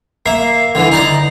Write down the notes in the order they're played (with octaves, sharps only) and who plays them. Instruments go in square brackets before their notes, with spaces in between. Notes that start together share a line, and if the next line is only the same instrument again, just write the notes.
[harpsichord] A#3 E5 [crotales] C7
[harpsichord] D3 E3
D#4 D5 A#5